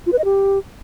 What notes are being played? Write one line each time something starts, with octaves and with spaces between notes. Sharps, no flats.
F4
B4
D#5
G4